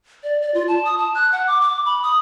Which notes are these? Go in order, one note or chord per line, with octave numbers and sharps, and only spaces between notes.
D5
D5
F4
A5
D#6
A5
F#6
F#5
D6
D6
B5
D#6